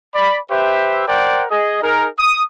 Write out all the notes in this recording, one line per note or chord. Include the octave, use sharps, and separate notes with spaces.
D5 B5
G4 B4 C5 E5
A#4 C5 D5 F#5 G5
G#4 D#5
D#4 G#4 A#4
D#6